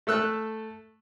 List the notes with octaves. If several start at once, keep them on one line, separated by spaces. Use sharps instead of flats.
A3 A4 E6 F#6